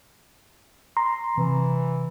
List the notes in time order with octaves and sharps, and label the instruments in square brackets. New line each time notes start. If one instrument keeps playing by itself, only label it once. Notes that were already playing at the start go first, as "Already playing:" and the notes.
[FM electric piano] A#5 C6
[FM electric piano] C3 [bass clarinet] E3